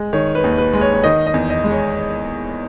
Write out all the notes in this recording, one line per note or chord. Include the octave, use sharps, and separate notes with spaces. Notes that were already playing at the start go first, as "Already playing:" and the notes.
Already playing: G#3
D#3 C#5
B4
D#2
B4
G#3
C#5
C#5
D#3 D#5
D#5
E2
D#5
G#3
C#5